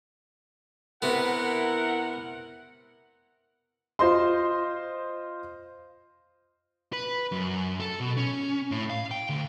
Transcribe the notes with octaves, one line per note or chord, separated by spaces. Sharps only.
C3 B3 E4 A#4 F#5
F4 C5 D#5 C6
B4
F#2
A4
B2
C#4
A2
F5
G5
D2